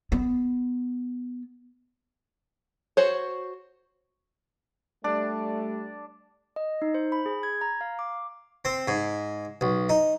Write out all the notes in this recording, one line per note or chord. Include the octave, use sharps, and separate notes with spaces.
B3
F#4 C5 C#5
G3 A3 D4
D#5
D#4
C5
B5
G#4
G#6
A#5
F5
D6
C4
G#2
B1
D#4